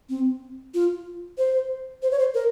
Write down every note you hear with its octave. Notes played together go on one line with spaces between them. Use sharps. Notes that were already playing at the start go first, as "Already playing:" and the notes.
C4
F4
C5
C5
C#5
C5
A#4